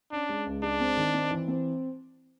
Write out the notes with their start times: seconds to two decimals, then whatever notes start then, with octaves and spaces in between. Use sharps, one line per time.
0.12 C#4 D4
0.29 G#3
0.46 C#2
0.63 G#3 D4
0.80 C4
0.97 D#3
1.14 C4
1.31 E3
1.48 C4